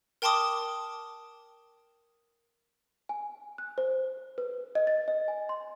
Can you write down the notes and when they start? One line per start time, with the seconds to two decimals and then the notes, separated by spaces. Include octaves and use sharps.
0.22 A#4 G5 A5 C6 D6 D#6
3.09 G#5
3.58 F#6
3.78 C5
4.38 B4
4.75 D#5
4.87 A6
5.08 D#5
5.28 G#5
5.49 C6